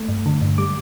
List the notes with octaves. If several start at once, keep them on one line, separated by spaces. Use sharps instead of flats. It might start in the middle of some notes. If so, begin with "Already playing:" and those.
Already playing: A3
G2
D3
G2
G3 D6